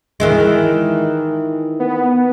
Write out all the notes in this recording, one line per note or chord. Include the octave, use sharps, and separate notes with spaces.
D#3 E3 G#3
B3